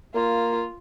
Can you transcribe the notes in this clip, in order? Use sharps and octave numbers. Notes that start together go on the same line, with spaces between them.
A#3 F4